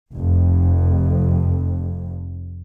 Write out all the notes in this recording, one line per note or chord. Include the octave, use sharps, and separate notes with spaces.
F1 F2